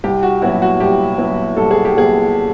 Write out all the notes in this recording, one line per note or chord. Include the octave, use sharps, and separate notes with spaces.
C2 G4
F#4
A#2 F#3 B3 E4 F#4
F#4
C2 G4
A#2 F#3 B3 E4
C2 A4
G#4
G4
A#2 F#3 B3 E4 G#4